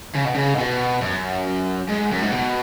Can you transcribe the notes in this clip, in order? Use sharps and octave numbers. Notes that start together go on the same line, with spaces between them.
C#3
B2
C#3
G#2
B2
F#2
G#2
F#2
G#2
B2